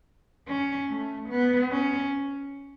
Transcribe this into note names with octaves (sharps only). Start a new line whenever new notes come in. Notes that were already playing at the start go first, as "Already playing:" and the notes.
C#4
A3
B3
C#4